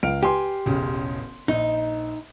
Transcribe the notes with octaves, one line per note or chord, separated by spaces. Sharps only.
C#2 F5 F6 D7
G4 B4 G#5 C6
E1 A1 C#3
A#1 D#4